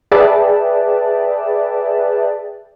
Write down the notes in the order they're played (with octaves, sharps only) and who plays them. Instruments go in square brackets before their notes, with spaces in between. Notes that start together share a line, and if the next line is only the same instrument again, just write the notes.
[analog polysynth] G#4 B4 D5 E5 G5 A5